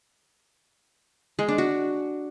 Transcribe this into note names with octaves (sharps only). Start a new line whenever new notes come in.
G#3
D4
F#4